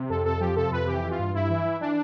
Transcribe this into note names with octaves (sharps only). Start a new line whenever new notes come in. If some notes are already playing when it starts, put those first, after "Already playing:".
Already playing: C3
F2 A4
F2 A4
F3 G4
C3 A4
F2 B4
E3 G4
E3
F4
G2
G2 E4
E3
E3
E3 D4